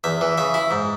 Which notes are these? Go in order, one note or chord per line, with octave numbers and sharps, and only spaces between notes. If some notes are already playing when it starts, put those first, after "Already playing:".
E2 E5
E3
C#3 E5
E4
G#2